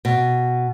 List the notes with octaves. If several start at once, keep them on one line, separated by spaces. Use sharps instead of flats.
B2